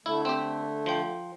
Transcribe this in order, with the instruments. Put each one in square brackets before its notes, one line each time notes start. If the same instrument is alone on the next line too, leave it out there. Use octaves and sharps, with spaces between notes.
[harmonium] D3 A3 [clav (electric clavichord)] E4
[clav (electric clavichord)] C4 G4
F3 G5